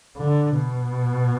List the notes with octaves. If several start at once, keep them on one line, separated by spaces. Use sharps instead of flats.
D3
B2